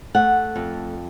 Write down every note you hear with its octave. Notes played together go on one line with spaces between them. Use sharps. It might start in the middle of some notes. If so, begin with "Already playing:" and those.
A3 F#5
F2